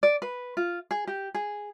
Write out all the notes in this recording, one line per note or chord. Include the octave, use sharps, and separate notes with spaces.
D5
B4
F4
G#4
G4
G#4